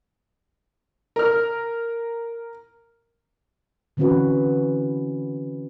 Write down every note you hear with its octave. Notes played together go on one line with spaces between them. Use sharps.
A#4 F6
D3 E3 C4 C#4 F#4 B4